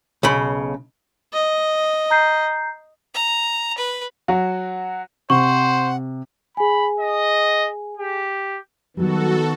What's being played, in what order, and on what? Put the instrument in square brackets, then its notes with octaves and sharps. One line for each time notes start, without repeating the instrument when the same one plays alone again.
[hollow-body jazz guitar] B1 C#3 B5
[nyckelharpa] D#5
[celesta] A#5 G6 C7
[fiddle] A#5
B4
[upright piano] F#3 F#4
[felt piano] C3 [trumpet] C5 [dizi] F#5 [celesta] C#6
[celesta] G#4 G#5 [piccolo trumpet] B5
[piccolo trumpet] D#5
G4
[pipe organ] D#3 B3 [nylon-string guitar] F#3 G3 [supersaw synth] F#4 A4